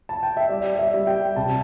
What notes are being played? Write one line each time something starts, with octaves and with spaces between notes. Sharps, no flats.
A5
G5
E5
G3 D5
D5
E5
G3
G5
C3 A5